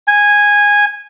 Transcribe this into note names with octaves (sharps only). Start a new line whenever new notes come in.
G#5